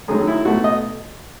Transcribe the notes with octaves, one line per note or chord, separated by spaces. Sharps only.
F#2 D#3 F#3 A3 G#4
E4
B1 B2 A3 F#4
D#5